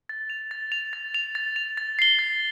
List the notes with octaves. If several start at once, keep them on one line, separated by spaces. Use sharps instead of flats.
A6
F7
A6
F7
A6
F7
A6
F7
A6
C7 G7
A6